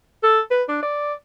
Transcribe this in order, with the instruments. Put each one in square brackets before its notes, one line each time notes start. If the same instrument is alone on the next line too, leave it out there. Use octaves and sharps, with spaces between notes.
[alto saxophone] A4
B4
D4
D5